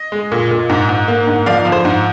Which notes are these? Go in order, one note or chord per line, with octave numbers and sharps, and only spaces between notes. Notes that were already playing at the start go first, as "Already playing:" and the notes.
Already playing: D#5
G#3
A#2
A#2
G#2
G#2
A#3
G#2
F3 D5 F5
F3
C5
G#2